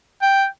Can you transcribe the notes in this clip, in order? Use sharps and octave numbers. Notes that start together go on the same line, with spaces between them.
G5